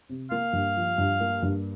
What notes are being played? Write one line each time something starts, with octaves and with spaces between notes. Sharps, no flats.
C3
A#3 F5
G2
F3
G2
A#3
G2